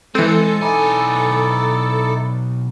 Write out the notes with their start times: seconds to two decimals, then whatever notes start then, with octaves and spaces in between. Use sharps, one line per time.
0.15 E3 G#3 C4 A4
0.61 B1 D#4 E4 D5 G#5